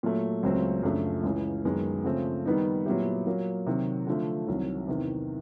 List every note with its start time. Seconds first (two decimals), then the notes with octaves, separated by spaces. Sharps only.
0.03 A#2 F#3 A3
0.43 C#2 C#3 F#3 A3 C4
0.83 F#2 C#3 F3 A3 D4
1.23 C#2 C#3 E3
1.65 F#2 D#3 G#3 B3
2.04 C#3 F3 A3 C4
2.46 D#3 G3 B3 D#4
2.86 A#2 F#3 B3 E4 G4
3.27 A#2 F#3 A#3
3.67 C3 D#3 F#3
4.07 D3 F3 A3
4.47 C2 C3 D#3 F#3
4.88 E2 C3 D#3